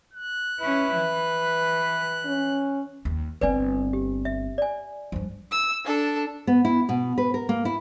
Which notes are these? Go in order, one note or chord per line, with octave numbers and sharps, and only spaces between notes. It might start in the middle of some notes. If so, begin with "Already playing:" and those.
F#6
C#4 E4 B4
E3
C#4
D#2
G1 C4 B4 D5 G#5
G4
E5
D5 G#5
G2 F3
E6
D4 A4
B3
E4
B2
B4
A#4
A#3
E4